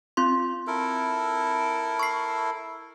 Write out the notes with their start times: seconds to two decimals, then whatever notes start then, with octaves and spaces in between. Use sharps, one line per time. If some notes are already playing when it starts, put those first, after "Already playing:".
0.17 C4 F4 C6
0.67 E4 A4 A#4
1.99 C#6 C7